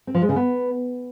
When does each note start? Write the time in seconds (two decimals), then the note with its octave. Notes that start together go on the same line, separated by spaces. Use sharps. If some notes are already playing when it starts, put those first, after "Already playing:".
0.07 C4
0.15 F3
0.22 G#3
0.29 C#3
0.36 B3